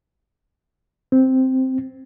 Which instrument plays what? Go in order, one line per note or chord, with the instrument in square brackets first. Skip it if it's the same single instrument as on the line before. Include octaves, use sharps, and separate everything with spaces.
[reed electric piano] C4